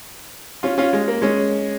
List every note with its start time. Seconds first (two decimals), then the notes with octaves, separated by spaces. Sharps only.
0.63 C#4 F4
0.78 C#4 F4
0.93 G#3
1.08 A#3
1.22 G#3 C#4